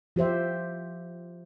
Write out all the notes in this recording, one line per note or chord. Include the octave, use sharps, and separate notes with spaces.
F3 G4 C5 E5